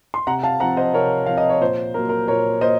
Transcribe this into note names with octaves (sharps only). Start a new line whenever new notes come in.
C6
C3 F#5 A#5
F5 A5
F3 C4 F#5 A#5
C5 D#5
C3 A#4 C#5
F3 C4 F5
D#5
C#5
A#2 C5
F#3 A#3 A#4
A#4
A#2 A#4 C#5
A#3 C5 D#5